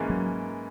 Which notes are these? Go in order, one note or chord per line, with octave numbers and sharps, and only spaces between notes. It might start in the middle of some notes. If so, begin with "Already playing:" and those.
Already playing: G#2 E3 A#3 C#4
F#3